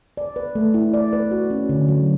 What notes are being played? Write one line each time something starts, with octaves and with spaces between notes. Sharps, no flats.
D5
B4
A3
E4
D5
B4
F#4
C#4
D3
F#3